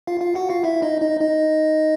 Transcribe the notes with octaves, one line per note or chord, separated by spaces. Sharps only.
F4 F5
F4 F5
F#4 F#5
F4 F5
E4 E5
D#4 D#5
D#4 D#5
D#4 D#5